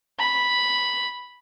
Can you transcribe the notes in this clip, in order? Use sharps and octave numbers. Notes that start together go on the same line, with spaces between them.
B5